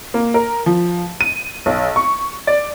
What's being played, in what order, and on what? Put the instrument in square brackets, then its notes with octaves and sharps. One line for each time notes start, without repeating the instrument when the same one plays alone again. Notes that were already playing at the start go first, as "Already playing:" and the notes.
[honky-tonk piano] A#3
A#4
F3
D#7
B1
C#6
D5